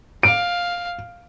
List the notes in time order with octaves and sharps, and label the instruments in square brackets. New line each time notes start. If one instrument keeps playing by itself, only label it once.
[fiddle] F5 [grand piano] D7